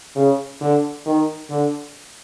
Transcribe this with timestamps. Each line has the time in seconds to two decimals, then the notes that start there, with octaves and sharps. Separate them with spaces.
0.15 C#3
0.61 D3
1.06 D#3
1.50 D3